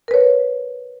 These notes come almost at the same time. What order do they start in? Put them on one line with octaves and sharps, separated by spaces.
A#4 B4 C#5